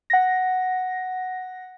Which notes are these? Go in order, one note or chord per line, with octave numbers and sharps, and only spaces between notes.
F#5 A#6